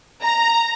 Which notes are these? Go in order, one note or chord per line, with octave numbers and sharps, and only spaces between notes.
A#5